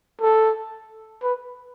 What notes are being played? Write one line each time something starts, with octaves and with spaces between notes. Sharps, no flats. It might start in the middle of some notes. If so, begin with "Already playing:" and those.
A4
B4